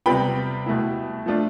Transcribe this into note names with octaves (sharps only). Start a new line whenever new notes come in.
C3 G3 B3 F4 G5 B5
B2 A3 E4
F3 A3 D4 F4